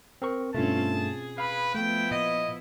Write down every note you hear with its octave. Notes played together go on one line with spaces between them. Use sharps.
C4 A#4 C#6
G2 B2 A3 C4 C#4 F4 A5
G#4
B4 F5 B5
F3 A3 B3 E4 G5
A#2 D#5